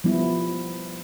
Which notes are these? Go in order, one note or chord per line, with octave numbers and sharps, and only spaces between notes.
F3 G3 B3 E4